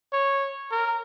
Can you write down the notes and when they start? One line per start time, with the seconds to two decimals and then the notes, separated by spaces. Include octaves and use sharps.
0.13 C#5
0.71 A#4